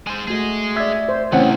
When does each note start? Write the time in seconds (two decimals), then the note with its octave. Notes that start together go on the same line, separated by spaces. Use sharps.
0.07 G#3 C5
0.28 A3 F#4 G#4 D#5
0.76 D5 E5 G#6
1.09 C5
1.32 C2 A2 C#3 E3 C4 C#4 F#5